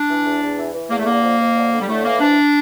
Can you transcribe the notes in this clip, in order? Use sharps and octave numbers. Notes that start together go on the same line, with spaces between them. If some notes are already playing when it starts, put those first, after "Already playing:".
Already playing: D4
E3
E2
E2
E3
E3
E2 A#3
A3
D3 A#3
F2
F2
D3
D3
G3
A2 A3
E3 A#3
F2 D4